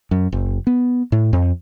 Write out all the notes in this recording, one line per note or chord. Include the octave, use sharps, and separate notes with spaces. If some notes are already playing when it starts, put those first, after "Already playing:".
F#2
F#1
B3
A2
F2